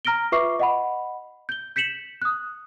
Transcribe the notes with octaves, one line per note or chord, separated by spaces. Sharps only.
A#5 F6 A#6 D7 G7
F4 B4 E5 C#6 D6 C7
D#5 F#5 B5
G6 G7
G6 B6 C#7 E7 F#7
D#6 F#6